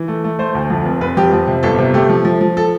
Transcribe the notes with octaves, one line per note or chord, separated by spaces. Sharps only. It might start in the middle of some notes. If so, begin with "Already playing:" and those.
Already playing: E3
A3
A3
A3 C5
D2
F2
F1
F1 B4
F2 G4
F2
C3
G1 A4
C3
A3 G4
F3
F3
F3
A4